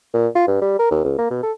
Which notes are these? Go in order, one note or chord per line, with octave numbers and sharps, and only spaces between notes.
A#2
F4
G2
G3
A#4
D#2
C#2
A#3
B2
A4